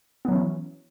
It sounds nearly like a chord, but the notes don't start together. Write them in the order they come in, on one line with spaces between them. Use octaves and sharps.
B3 F#3 C#4 E3